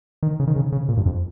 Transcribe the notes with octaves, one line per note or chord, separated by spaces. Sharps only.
D#3
C#3
D#3
C#3
C#3
A#2
G2
F2